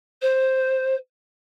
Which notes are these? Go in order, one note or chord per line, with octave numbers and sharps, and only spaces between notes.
C5